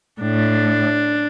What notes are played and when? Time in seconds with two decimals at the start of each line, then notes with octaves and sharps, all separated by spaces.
0.21 A2 D4